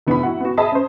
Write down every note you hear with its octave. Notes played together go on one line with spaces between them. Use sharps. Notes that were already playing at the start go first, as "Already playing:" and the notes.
F1 B3 D4 E4 B5
E4 F#4 F#5
B3 F#4
G#4 D#5 E5 A5 B5 D#6
C#4 C5